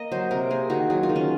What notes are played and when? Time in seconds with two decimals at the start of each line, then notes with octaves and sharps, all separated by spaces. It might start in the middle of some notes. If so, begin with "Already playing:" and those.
Already playing: A#3 A#4 D#5
0.12 F#3 C5
0.31 C3 A#4
0.50 A#3 G#4
0.70 D#3 F#4
0.90 F#3 G#4
1.03 F4
1.09 D#3
1.16 C#4